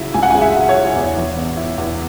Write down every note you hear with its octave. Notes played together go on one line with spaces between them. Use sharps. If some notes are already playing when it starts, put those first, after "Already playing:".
Already playing: C#3 F#3 E4 E5
C#2 G#5
F#5
G#5
C#3
E5
F#3
C#5
E4
E2
E3
B3
E4
E2